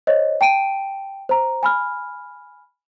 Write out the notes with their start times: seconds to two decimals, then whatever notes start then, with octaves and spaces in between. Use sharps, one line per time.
0.07 C5 C#5 D#5
0.41 G5 A5 D7 D#7
1.29 C5 A#5
1.63 G#5 B5 F6